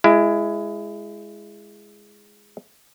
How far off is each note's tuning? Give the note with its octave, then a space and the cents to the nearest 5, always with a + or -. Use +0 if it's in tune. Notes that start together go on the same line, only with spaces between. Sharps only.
G#3 +0 E4 +25